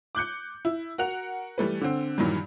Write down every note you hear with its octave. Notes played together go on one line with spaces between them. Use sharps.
D6 F#6 G6 C#7
E4
F#4 A#4 F#5 F7
E3 G3 A3 B4
D3 C4
G2 A#2 D#3 E3 F#3 G3